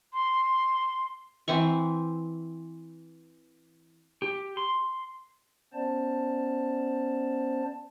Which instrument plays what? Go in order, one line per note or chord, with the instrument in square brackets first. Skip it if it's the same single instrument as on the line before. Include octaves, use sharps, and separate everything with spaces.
[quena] C6
[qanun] E3 C4 E5 C#6
[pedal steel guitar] G4
C6
[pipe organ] B3 C#4 C5 D5 A5